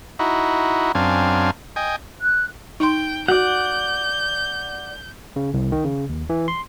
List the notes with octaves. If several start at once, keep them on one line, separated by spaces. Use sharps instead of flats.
D#4 E4 F#4
F#2 C4 D4 F5 G#5
D#5 G5 G#5
F#6
D#4 G5 C6
F#4 D5 F#5 G6
C#3
C2
D#3
C#3
D#2
E3
C6